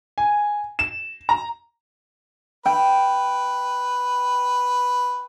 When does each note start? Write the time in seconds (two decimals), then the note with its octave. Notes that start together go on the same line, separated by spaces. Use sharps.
0.18 G#5
0.79 E7
1.29 A#5
2.66 B4 G5